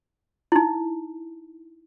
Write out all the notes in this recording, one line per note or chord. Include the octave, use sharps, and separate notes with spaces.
D#4 E4